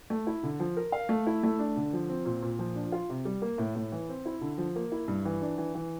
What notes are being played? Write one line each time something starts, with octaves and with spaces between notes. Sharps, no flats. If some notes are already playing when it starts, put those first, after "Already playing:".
A3
E4
D3
F3
A#4
F5
A3
E4
A3
D4
D3
F3
C4
A#2
A#2
F3
D4
F4
C3
G3
A#3
A2
A2
E3
C4
E4
D3
F3
A#3
E4
G2
E3
D4
E3
E3